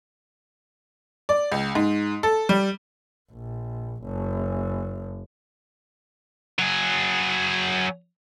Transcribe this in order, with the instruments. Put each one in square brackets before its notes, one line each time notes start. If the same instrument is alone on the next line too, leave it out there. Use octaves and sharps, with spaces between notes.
[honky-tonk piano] D5
C#2
G#2
A4
G3
[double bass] A#1
F#1
[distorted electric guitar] F#3 G#4